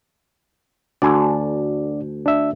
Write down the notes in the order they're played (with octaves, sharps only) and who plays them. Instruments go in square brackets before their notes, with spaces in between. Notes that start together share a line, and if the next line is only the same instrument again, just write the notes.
[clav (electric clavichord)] D2 A4 G#5 [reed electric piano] D4 F#4 D5
[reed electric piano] D4 E5